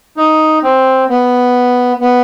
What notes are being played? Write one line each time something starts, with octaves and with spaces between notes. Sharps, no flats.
D#4
C4
B3
B3